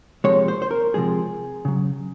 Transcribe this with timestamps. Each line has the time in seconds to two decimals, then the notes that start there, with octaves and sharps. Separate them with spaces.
0.24 C3 F3 G#3 C#5
0.48 C5
0.62 C5
0.71 A#4
0.94 C3 F3 G#3 G#4
1.65 C#3 F#3